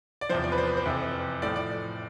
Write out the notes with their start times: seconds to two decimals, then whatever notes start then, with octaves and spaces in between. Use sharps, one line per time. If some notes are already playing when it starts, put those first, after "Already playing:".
0.21 D5
0.29 E2 C3 F3 C5
0.44 D5
0.52 B4
0.58 C5
0.67 B4
0.77 C5
0.85 F2 C3 E3
1.42 A2 F3 D5
1.56 D5